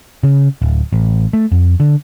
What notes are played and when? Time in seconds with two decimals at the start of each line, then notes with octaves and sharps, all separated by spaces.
0.23 C#3
0.62 D1
0.93 A1
1.33 A3
1.52 F2
1.80 D3